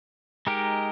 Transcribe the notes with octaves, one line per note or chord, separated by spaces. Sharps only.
G#3 D#4 G4 A#4